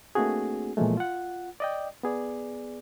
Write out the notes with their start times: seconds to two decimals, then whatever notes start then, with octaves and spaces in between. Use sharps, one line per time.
0.15 A3 A#3 C4 D4 F#4 G#4
0.77 A#2 E3 F3 G#3 A3
0.97 F4 F#5
1.60 D5 D#5 G5
2.03 B3 G#4 D5